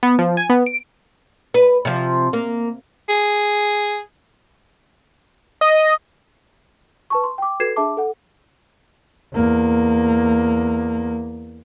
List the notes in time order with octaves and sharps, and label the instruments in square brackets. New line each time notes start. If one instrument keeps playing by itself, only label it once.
[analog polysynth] B3
F3
G#5
B3
D7
[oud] B4
C3 F3
A#3
[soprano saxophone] G#4
[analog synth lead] D#5
[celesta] B4 A5 C#6
C6
G5 D6
F#4 A4 B4 G#6 C7 E7
D4 G#4 E5 A5 D6
A4 F#5
[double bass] E2 A#3